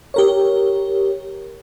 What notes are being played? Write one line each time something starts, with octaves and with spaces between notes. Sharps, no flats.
G4 A#4 C#5